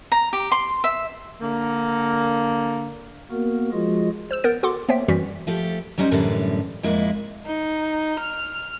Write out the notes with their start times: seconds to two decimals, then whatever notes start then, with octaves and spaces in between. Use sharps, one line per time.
0.12 A#5
0.33 G4
0.52 C6
0.84 E5
1.41 D3 A#3
3.31 A#3 B3 F#4 A#4
3.72 F3 G#3 F4 F#4 G#4 D#5
4.31 C5 E6 E7
4.44 B3 A#4 G6 A6 D7
4.63 F#4 A4 F#5 C6 D6
4.89 A#3 B3 C5 C#5 E5 G5
5.08 F#2 E3 G3 F#4 B6
5.47 F3 A3 G4
5.98 F#3 G3 C#4 D#4 C5
6.11 F#2 A2 D3 E3 G3
6.83 F2 A#2 G#3 A#3 E4
7.46 D#4
8.19 F6